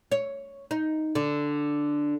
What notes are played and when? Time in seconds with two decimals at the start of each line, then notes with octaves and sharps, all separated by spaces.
0.12 C#5
0.71 D#4
1.15 D3